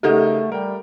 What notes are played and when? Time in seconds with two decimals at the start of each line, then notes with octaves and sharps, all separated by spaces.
0.03 C#3 A3 D#4 G4 A4 A#4 F#5
0.52 G3 A#4 G5